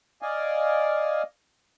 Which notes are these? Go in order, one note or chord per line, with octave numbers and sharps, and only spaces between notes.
D5 D#5 F5 G#5